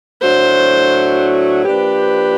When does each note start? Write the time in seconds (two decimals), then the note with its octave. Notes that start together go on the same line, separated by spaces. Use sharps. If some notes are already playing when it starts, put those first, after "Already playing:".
0.22 A2 F#3 A3 D4 F#4 C5
1.65 F3 A#3 D4 G4 B4